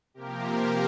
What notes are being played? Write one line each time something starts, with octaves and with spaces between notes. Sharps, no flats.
C3 F3 A#3 G4 A#4
G4 A#4